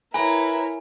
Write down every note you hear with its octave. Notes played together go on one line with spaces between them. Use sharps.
E4 A#4 B4 C#5 G#5 A#5